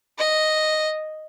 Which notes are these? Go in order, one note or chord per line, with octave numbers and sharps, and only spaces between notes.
D#5